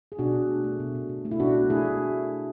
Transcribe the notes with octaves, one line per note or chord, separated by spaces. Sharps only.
G#4
B2 D4 F#4
B2
A3
A3
B2
B2
B2
A3
E4
B2 D4 F#4
A3
A3 E4 G#4
A3